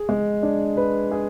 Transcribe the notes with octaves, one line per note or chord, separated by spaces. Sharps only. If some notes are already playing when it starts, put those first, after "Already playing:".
Already playing: G#4
G#3
D4
B4
G#4